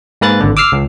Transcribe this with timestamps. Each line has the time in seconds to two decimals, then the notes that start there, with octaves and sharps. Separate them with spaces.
0.21 G#2 A#3 B4 F#6 A6
0.40 G#1 D3
0.57 D6 E6 F6 C7
0.72 C#2